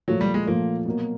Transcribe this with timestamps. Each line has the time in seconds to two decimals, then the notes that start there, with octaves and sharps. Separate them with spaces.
0.08 A#2 F3 F#3 A3
0.21 G3
0.34 G#3
0.47 A#2 F3 A3 A#3
0.86 B2 F#3 A#3